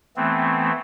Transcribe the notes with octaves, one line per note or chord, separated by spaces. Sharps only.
E3 A3 B3 C4